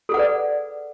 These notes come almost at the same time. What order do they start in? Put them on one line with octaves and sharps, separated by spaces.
A4 G#4 F#5 B4 D5